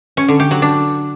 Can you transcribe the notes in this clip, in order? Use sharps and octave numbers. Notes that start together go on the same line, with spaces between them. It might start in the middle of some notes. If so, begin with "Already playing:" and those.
C#4
D3
G4
F#3
D4